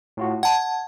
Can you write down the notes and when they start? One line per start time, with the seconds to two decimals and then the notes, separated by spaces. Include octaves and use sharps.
0.17 A2 F4 F#4
0.43 F#5 A5 G#6